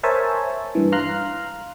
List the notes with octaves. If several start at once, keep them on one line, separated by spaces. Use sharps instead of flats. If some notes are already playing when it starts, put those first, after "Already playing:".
A#4 C5 C#5 E5 G#5 A5
G2 E3
F5 A#5 C6 F6 F#6